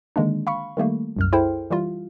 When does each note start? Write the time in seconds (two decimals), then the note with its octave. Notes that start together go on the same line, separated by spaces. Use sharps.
0.16 D3 D#3 G#3 A#3 D4
0.47 F5 B5 C#6
0.77 D#3 G3 A3 A#3
1.16 C2 F#2 F6
1.33 E4 G#4 A4 C5 G5
1.70 E3 G3 E4 F4